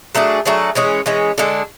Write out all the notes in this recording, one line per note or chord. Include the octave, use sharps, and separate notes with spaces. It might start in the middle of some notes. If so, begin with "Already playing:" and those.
F#3 A3 D4 G#4
F#3 A3 D4 G#4
E3 G#3 C#4 G#4
E3 G#3 C#4 G#4
D3 G#3 D4 A4